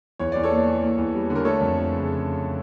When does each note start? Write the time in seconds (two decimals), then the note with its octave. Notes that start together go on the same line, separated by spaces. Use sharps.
0.19 E2 C#5
0.32 E2 D5
0.43 A4 C#5
0.51 A#3
0.67 E3
0.82 A#3
0.98 E2
1.14 G3
1.30 D3
1.35 A#4
1.45 A3 A4 C#5
1.61 F2
1.77 F3
1.93 C#3